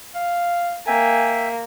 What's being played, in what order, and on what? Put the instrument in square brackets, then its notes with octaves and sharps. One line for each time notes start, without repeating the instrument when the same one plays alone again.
[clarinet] F5
[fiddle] A#3 [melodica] E5 G5 [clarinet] G#5